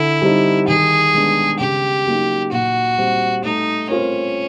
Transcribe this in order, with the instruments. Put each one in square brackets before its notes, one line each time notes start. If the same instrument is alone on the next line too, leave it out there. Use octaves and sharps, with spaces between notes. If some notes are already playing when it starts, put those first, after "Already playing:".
Already playing: [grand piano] D3 [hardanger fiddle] E4
[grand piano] G3 C4 D#4
[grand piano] D#3 [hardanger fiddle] G#4
[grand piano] G#3 B3 D4
[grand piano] C#3 [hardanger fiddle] G4
[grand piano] F#3 A#3 D#4
[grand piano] A#2 [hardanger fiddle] F#4
[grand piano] G3 C4
[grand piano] A3 [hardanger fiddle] D#4
[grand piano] C4 F4 A#4 [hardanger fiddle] C#4